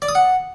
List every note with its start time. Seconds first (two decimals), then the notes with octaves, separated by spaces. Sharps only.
0.02 D5
0.09 D#6
0.15 F#5